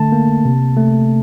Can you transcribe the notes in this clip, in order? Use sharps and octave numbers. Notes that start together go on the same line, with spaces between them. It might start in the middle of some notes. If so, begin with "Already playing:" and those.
Already playing: D3 A3 A5
A#3
C3
A3